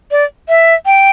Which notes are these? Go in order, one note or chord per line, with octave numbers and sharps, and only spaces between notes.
D5
E5
G5